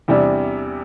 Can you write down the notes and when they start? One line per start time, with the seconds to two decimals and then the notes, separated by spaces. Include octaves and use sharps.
0.08 E2 C3 G3 D4